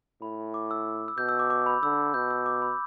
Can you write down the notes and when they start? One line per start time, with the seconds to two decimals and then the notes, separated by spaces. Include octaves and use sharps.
0.22 A2 B5
0.54 D6
0.71 E6
1.08 E6
1.18 B2 G6
1.29 E6
1.39 D6
1.50 D6
1.66 B5
1.83 D3 E6
2.14 B2 G6
2.31 E6
2.46 D6
2.62 B5